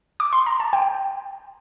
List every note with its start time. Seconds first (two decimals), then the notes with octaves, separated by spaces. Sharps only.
0.20 D6
0.33 C6
0.46 A#5
0.60 A5
0.73 G5